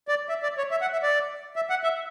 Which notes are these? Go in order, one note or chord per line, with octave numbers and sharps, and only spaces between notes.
D5
E5
D5
C#5
E5
F#5
E5
D5
E5
F#5
E5